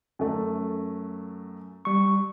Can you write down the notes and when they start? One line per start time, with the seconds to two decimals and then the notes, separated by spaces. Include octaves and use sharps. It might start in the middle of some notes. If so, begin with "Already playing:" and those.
0.19 F#2 A3
1.85 G3 C#6